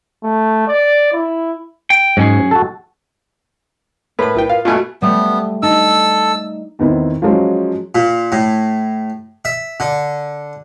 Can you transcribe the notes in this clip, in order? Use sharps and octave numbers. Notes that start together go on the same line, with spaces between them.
A3
D5
E4
G5
G#2 F#3 C#4 G#4
F#4 A4
A2 A#4 B4 B5
B1 E4 G5
F4 F5
G2 B2 A3 F4 F#4 F5 G#5
G3 A3 B3
D#4 A4 E6
E2 D#3 B3 C4 E4
F3 F#3 G#3 C#4
A#2
A2
E5
D3